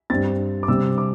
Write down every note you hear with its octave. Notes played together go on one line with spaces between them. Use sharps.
G2 G3 C4 A6
D6
C3 G3 C4 E6
D6